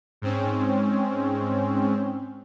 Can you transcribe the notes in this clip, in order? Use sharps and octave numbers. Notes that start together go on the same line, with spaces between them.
G#2 C4 C#4